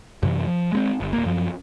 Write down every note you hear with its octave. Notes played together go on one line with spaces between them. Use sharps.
F#2 C3 E3
F3
G#3 B3 C4
G1
D1 A#3
F#2 F3